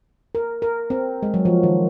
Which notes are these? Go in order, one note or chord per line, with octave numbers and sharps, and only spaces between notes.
A#4
A#4
C4
G#3
F#3
F3
D#3